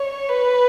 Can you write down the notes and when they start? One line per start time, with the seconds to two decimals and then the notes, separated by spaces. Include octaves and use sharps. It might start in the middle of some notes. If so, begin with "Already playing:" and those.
Already playing: C#5
0.29 B4